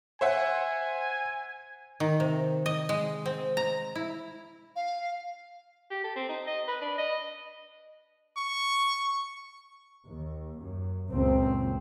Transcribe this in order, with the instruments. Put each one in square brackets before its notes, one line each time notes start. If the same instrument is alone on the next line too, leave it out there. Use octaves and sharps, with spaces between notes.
[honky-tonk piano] C5 E5 F#5 [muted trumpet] G#5
[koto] D#3
C3
D#5
G#3
C4
A#5
E4
[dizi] F5
[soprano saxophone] G4
A4
C4
D#4
D#5
B4
D4
D#5
[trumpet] C#6
[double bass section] D#2
F#2
F#1 C#2 F#2 A#2 C4